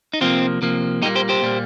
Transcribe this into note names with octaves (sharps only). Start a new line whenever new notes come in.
D#4
C3 F3 A#3 C4 F4
C3 F3 A#3
A#2 G3 A#3 D#4 G4
G4 C5
G4 C5
A#2 G3 A#3